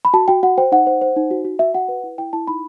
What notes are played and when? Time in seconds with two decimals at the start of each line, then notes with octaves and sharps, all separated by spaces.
0.05 B5
0.14 F#4 A5
0.28 F#4 G5
0.43 F#4 F#5
0.58 C5 G5
0.72 D#4 F#5
0.87 C5
1.02 C5
1.16 D#4
1.31 F#4
1.45 F#4
1.59 F#4 E5
1.74 F#4 F#5
1.88 B4
2.03 E4
2.18 E4 G5
2.33 E4 A5
2.47 D#4 B5